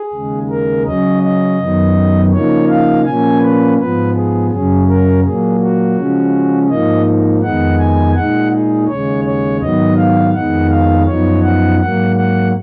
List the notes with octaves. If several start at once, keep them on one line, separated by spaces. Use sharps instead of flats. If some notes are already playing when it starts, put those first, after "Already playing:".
Already playing: G#4
D#2 C#3 G#3
A#4
C#3 F#3 C#4 D#5
D#5
F#2 D#3 F#3 B3 D#4
C#3 F3 A#3 D#4 C#5
F5
A#2 F3 A#3 C#4 G#5
B4
G#2 F3 B3 B4
G#4
F#2 C#3 F#3 C#4 G#4
A#4
A#2 F#3 A#3 G#4
F#4
C#3 F3 G#3 C#4
G#2 F3 A#3 D#4 D#5
F2 D#3 G#3 B3 D#4 F#5
G#5
A#2 G#3 D#4 F#5
G#4
D#2 C#3 G#3 C#5
C#5
G#2 D#3 F#3 B3 D#5
F5
F2 D#3 G#3 B3 D#4 F#5
F5
F#2 F3 B3 D#4 C#5
F#5
G#2 F#3 A#3 F#5
F#5